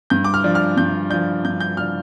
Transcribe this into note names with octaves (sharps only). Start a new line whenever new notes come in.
G2 G6
D6
F6
F3 D4
F6
G2 G6
F3 D4 G6
G2 G6
G6
F3 D4 F6